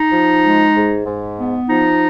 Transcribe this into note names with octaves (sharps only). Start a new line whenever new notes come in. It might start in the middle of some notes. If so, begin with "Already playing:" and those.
Already playing: D#4
F3
G#3
G#2
G#2
B3
F3 D#4